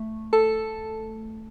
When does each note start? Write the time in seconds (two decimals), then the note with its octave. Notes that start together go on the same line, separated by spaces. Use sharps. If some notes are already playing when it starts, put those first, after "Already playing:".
Already playing: A3
0.33 A4 A5